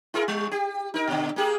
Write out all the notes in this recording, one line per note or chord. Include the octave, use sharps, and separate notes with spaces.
E4 G#4 A#4
G3
G4
D#4 A#4
A#2 D3
A#3 G4 G#4